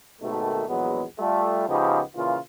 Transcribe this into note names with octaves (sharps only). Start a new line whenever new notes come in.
G#1 B2 D#3 A3
A#1 E2 F#3 G#3 B3
G3 A3 F4
C#2 C#3 F3 B3 D#4 G4
A#2 C#3 E3 F4